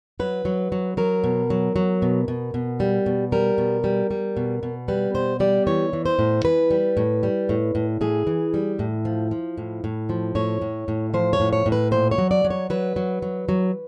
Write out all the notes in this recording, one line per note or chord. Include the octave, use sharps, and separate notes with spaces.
F#3 B4
F#3
F#3
F#3 A#4
B2
F#3
F#3
B2
B2
B2
G3
B2
G3 A#4
B2
G3
G3
B2
B2
G3 B4
B2 C5
G3 D5
E3 C#5
E3
C5
A2
E3 B4
G3
A2
G3
A2
A2
A2 G#4
E3
G3
A2
F3
F3
A2
A2
F3
A2 C#5
A2
A2
F3 C5
C#5
A2
C#5
A2
B4
A#2 C5
C#5
F#3
D5
F#3
C#5
F#3 B4
F#3
F#3
F#3